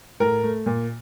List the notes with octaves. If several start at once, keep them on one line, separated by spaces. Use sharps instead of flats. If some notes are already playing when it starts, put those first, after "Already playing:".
A2 A#4
A3
A#2